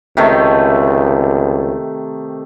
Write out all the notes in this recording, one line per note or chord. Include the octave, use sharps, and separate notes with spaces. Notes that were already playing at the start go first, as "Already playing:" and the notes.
C#2 C3 D#3 A3